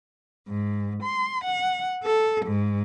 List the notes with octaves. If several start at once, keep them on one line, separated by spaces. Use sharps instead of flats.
G#2
C6
F#5
A4
G#2